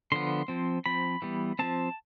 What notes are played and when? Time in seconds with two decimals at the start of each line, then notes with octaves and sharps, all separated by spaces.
0.12 D3 F3 B3 C6
0.48 F3 C4
0.86 F3 C4 B5
1.22 E3 G3 B3
1.59 F3 A3 C4 A5